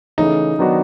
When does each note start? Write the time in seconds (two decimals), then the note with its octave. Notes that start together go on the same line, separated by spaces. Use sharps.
0.18 C#3 E3 A3 D#4
0.59 D#3 F#3 B3 D4 F#4